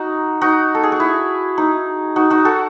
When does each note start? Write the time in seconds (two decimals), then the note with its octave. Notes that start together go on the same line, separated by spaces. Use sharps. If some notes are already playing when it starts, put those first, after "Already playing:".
Already playing: D#4 F#4
0.41 D#4 F#4
0.75 A4
0.83 G#4
0.92 F#4
1.00 E4
1.58 D#4
2.16 D#4 F#4
2.30 D#4 F#4
2.45 F#4 A4